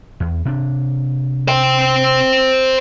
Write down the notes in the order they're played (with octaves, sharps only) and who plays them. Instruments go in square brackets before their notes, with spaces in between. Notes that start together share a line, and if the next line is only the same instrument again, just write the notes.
[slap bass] E2
C3 D4
[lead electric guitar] C5 G5